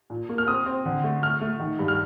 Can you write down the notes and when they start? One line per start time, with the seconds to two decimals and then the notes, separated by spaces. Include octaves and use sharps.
0.10 A#2
0.29 A#3
0.38 F6
0.47 C4 D#6
0.66 C4
0.85 D3
1.04 A3
1.22 A3 F6
1.41 A3
1.60 D#3
1.79 G2
1.88 F6